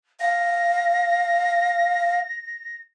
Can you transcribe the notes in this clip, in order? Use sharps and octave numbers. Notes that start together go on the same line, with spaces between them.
F5 A#6